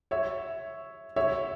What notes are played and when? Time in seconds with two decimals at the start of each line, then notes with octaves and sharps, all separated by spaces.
0.11 C#5 E5
1.16 C#5 E5